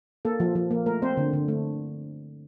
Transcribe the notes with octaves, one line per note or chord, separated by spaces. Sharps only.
A#3 A4
F3
F3
A#3
A3 A#4
C4 C5
D3
D3
A3